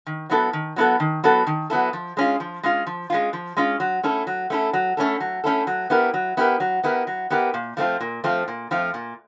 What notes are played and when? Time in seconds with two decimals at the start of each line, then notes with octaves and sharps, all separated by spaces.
0.07 D#3
0.30 F#3 B3 E4 A4
0.53 D#3
0.76 F#3 B3 E4 A4
1.00 D#3
1.24 F#3 B3 E4 A4
1.47 D#3
1.70 F#3 B3 E4 A4
1.93 F3
2.17 G#3 C#4 F4
2.40 F3
2.63 G#3 C#4 F4
2.87 F3
3.10 G#3 C#4 F4
3.33 F3
3.57 G#3 C#4 F4
3.80 F#3
4.03 A3 C#4 E4 A4
4.27 F#3
4.50 A3 C#4 E4 A4
4.73 F#3
4.97 A3 C#4 E4 A4
5.20 F#3
5.44 A3 C#4 E4 A4
5.67 F#3
5.90 B3 E4 G4 A#4
6.14 F#3
6.37 B3 E4 G4 A#4
6.60 F#3
6.84 B3 E4 G4 A#4
7.07 F#3
7.30 B3 E4 G4 A#4
7.54 A#2
7.77 F3 A3 C4 F4
8.01 A#2
8.24 F3 A3 C4 F4
8.48 A#2
8.71 F3 A3 C4 F4
8.94 A#2